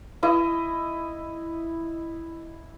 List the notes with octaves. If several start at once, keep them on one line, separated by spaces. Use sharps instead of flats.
E4 D#5